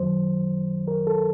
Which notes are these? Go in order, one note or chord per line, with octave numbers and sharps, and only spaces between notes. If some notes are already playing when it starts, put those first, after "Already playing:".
Already playing: F#2 D#3 F#3 C5
A#4
A4